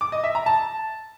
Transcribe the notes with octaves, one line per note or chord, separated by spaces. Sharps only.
D6
D#5
E5
A#5
A5